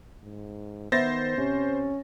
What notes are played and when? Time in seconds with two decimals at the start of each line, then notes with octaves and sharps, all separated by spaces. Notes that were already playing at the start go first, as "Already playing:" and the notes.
0.23 G#2
0.92 D#3 B3 C5 E5 A6 A#6
1.38 C3 C#4